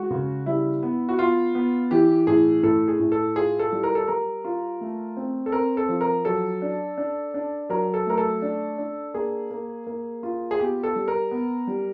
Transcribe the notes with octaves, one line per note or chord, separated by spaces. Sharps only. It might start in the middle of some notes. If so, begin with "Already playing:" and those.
Already playing: G#3 F#4
C#3
G3 E4
B3
F#4
B3 F4
B3
E3 G4
A2 G#4
A2 A4
G#4
A2
A4
F4 G#4
A4
G3
A#4
A4
G3 A#4
F4
A3
C4
A4
C4 A#4
A4
F3
A#4
F#3 A4
D4
D4
D4
F#3 A#4
A4
A3 A#4
A4
D4
D4
A#3 G#4
A#3
A#3
F4
G#4
B3 G4
A4
G3
A#4
B3
G3